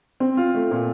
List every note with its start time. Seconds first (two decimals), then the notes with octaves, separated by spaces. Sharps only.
0.20 C4
0.37 F4
0.55 A3
0.71 A#2